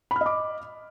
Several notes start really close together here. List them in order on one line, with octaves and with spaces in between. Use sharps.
B5 F6 D#5 D6